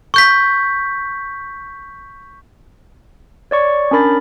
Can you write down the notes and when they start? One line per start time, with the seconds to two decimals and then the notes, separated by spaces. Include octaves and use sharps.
0.14 C#6 G6 B6
3.51 C#5 D5 C#6
3.91 C#4 D4 A#4 B5 A6